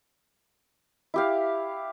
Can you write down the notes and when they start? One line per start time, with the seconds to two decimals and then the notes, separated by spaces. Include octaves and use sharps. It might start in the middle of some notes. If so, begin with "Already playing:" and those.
1.14 E4 G4 F5